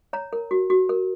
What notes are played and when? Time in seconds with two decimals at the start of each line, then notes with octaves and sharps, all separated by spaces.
0.13 C#5 A#5
0.33 A#4
0.51 F#4
0.70 F#4
0.89 A#4